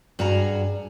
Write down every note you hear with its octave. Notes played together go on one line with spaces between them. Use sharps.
G2 F#4 G#4 A#5